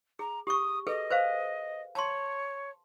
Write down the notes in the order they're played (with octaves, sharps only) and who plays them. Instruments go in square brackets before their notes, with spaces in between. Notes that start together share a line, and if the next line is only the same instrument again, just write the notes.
[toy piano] G#4 [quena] A#5
[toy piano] G4 C#6 [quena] D#6
[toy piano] G#4 A4 B4 [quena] D#5
[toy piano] B4 C5 F5
[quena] C#5 [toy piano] A5 C6